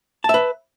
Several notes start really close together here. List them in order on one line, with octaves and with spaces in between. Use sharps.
A5 E5 B4